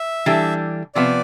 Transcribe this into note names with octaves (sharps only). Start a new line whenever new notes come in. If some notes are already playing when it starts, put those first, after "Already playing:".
Already playing: E5
E3 G3 D4 A4
C3 F3 B3 D5